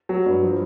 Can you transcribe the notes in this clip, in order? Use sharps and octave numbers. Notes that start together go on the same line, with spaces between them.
F#3
G2
F3